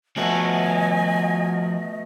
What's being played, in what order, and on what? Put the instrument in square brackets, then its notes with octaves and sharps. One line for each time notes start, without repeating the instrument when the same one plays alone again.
[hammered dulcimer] B2 A3 E5 [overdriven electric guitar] F3 F#4 [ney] D#5 [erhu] G#5